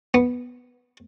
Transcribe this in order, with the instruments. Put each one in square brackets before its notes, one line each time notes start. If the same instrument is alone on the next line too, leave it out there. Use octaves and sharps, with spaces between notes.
[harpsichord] B3